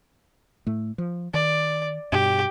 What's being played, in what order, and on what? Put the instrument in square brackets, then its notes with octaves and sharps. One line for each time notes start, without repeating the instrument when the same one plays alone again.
[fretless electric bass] A2 A3
F3
[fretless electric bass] D#3 [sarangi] D5
[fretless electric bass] G2 B2 [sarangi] G4